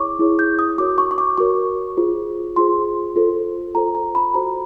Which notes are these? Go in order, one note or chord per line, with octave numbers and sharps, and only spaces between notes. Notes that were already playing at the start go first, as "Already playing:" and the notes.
Already playing: E4 G#4 C#5 C#6 D6
E4 G#4 C#5
G6
D#6
F#4 A#4 C#5 D6
C#6
C#6
D6
F#4 A#4 C#5 C#6
F4 G#4 C5
F4 G#4 C5 C6
F4 A4 C5
F4 A4 C5 A#5
A#5
B5
F#4 A4 C5 A#5